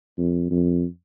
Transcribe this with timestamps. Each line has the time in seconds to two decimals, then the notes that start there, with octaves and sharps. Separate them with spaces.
0.18 F2
0.51 F2